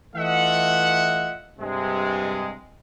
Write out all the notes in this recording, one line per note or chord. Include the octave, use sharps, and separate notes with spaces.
E3 A3 F4 D#5 E5 F#5
G2 C3 G#3